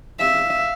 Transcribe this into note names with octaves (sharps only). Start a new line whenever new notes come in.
E5 F5